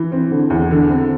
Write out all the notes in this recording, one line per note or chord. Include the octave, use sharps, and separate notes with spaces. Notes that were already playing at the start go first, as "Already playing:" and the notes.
Already playing: E3
C4
D3
E2
D3
C4